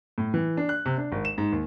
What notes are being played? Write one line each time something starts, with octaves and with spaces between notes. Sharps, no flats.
A2
E3
D4
F#6
C3
D4
G#1
E7
G#2
D#2